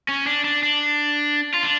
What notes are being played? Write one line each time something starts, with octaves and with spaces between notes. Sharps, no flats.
C#4
D4
D4
D4
F4
D4